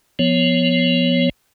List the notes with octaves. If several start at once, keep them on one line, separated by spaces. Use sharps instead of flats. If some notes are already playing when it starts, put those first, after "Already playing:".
F3 B3 C#5